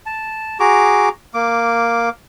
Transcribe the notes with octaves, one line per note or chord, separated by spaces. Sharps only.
A5
F#4 G#4 A#5 D6
A#3 D6